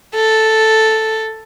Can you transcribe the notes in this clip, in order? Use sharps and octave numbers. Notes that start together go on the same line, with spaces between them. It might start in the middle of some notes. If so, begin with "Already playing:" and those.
A4